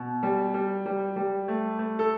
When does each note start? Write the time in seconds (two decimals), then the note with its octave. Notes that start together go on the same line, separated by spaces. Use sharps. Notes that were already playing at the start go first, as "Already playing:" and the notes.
Already playing: B2
0.23 G3
0.54 G3
0.86 G3
1.16 G3
1.48 A3
1.79 A3
1.99 A4